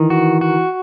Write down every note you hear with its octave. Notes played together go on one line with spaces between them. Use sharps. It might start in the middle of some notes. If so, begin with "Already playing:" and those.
Already playing: D#3 E3
F#4
F#4